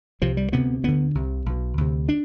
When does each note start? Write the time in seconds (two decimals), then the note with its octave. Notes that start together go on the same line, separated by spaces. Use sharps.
0.21 C2 C3 F3
0.37 G3
0.52 D2 C3 B3
0.84 D2 D3 B3
1.15 C2 C3
1.46 B1 B2
1.78 D2 C3
2.09 D4